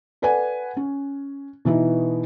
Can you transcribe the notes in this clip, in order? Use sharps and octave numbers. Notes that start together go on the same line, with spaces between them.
A4 B4 D5 F#5 G#5
C#4
B2 E3 D#4 E4